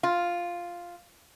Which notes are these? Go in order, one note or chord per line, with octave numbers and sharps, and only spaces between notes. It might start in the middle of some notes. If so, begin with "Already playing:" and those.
F4